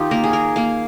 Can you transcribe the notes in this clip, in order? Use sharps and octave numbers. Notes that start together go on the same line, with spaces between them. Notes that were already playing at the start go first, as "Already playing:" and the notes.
Already playing: D#3 D#4 F4 G4
A#3 A#4
G#4
A#4
A#3 F5